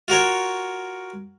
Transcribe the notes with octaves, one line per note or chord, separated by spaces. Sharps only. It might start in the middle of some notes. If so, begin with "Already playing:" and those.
F4 F#4 A#4 C#5